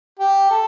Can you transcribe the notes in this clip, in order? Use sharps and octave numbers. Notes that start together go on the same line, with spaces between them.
G4
A4